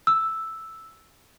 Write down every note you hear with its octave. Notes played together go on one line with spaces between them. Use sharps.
E6